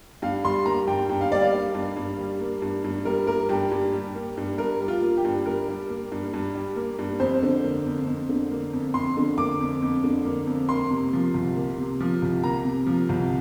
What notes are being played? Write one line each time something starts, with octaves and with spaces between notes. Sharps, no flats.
G2 F5
G3 C6
A#3 A#5
G2 G5
G2 G5
F5
G3 D5
F5
A#3
G2
G2
G3
A#3
G2
G2
G3 A#4
A#3 A#4
G2 G4
G2
G3
A#3
G2
G2 A#4
G3
F4
A#3
G4
G2
G2 A#4
G3
A#3
G2
G2
G3
A#3
G2
F2 C5
D3
A#3
F2
F2
D3
A#3
F2
F2 C6
D3
A#3 D6
F2
F2
D3
A#3
F2
A#3 C6
C3
F3
C2
A#3
C3
F3
C2
A#3 A#5
C3
F3
C2